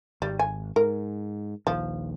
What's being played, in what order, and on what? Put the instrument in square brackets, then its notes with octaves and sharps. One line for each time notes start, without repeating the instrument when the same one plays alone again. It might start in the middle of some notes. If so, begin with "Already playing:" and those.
[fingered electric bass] G#1 [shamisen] G3
[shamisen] G#5
[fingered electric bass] G#2 [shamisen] A#4
[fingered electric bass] A#1 D#2 [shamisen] F3